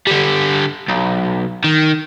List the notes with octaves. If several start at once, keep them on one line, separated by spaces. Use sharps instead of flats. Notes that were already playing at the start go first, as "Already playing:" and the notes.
D3 G3
B1
D#3